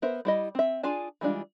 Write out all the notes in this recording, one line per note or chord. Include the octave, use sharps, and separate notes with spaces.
B3 A#4 C5 E5
G3 E4 D#5
C4 E5
D4 F4 G#4 G#5 A5
E3 G3 G#3 D4 F4